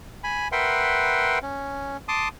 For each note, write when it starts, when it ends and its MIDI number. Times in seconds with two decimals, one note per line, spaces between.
0.24 0.48 80
0.24 0.48 83
0.52 1.39 70
0.52 1.39 71
0.52 1.39 76
0.52 1.39 78
0.52 1.39 79
0.52 1.39 84
1.43 1.97 61
2.08 2.28 81
2.08 2.28 84
2.08 2.28 86
2.08 2.28 87